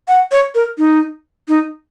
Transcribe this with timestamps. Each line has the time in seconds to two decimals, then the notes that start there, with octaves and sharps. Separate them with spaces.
0.08 F#5
0.32 C#5
0.55 A#4
0.78 D#4
1.48 D#4